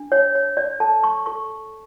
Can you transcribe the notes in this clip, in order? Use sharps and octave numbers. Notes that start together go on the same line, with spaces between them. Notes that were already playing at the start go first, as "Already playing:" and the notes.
Already playing: D4
C#5
C#5
D5
A4 A5
C#6
A4 C#6